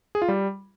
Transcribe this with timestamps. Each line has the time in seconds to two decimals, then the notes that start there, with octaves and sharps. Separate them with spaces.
0.15 G#4
0.22 F4
0.28 G3